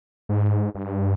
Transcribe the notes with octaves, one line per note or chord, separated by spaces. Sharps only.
G#2
G2